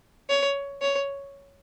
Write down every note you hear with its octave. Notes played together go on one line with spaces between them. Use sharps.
C#5
C#5